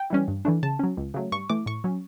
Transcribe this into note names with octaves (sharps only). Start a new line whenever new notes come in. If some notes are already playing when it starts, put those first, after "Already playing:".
Already playing: G5
E3 G3 C#4
G2
E3 A3 D4
C#3 A5
F#3 C#4
C#2
C#3 F#3 A3
G2 C#6
E3 A3 D6
A2 C#6
F#3 C#4